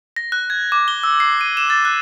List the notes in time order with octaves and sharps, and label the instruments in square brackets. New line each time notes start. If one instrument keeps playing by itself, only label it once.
[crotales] A#6
F#6
G#6
D6
G7
E6
C7
D#7
E7
A6
F#6